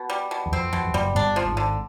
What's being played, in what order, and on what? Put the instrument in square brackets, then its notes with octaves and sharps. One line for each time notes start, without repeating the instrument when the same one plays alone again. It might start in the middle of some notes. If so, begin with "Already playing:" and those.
Already playing: [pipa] B2
G3
B2
[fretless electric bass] E2
[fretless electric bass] F2 [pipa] C4
[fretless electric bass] F2 [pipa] B2
[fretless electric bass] F2
[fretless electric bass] F#1 F#2 [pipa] G3
[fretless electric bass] G1 G2 [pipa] D4
[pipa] F3
[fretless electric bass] G#1 G#2
[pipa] D3